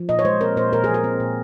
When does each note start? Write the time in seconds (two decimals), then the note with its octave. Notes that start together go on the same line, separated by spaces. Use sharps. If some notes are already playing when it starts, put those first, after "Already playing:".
Already playing: F3
0.09 A#2 D#5
0.19 C#5
0.25 G#3 C5
0.41 C4 A#4
0.57 A#2 C5
0.72 A#2 A#4
0.84 F3 G#4
0.94 A#4
1.04 C4
1.20 A#2